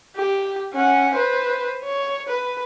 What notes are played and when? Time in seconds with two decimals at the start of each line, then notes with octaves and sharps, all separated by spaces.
0.16 G4
0.73 C#4 F#5
1.14 B4 C5
1.84 C#5
2.28 B4